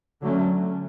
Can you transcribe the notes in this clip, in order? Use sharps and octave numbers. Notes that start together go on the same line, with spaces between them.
D3 F#3 A3 C#4